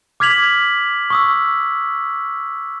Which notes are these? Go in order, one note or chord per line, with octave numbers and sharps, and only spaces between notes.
D6 F6 G#6 B6 F7 F#7
C#6 D#6 E6